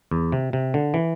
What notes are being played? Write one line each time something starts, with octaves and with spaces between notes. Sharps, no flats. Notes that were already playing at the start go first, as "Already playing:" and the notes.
E2
C3
C3
D3
E3